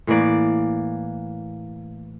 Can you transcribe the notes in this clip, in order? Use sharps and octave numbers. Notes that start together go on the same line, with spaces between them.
A2 E3 A#3 D5